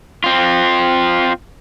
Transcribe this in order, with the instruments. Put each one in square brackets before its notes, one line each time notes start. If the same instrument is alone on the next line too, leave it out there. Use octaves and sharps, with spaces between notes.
[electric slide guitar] C4 F4